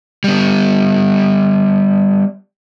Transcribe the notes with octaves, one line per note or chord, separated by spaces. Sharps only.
G3 B3